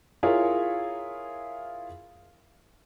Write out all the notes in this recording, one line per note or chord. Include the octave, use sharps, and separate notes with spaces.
E4 F4 G#4 A#4 C#5